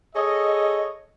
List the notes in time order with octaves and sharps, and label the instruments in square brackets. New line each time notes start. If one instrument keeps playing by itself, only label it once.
[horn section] G#4 A4 C#5 D#5